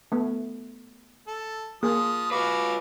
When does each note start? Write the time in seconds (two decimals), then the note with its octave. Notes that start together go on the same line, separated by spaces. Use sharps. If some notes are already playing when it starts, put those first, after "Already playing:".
0.12 A3 B3
1.27 A4
1.83 F3 A#3 G#4 D#6
2.31 F4 F#4 B4 F5 D6